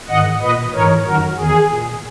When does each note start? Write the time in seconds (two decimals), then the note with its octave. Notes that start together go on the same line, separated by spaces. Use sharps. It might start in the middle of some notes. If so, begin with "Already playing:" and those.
0.08 G#2 D#3 D#5 F#5
0.41 A#2 B4 D#5
0.73 G#2 E3 A#4 C#5
1.05 F#2 D#3 F#4 A#4
1.38 E2 D#3 G#4
1.70 A#2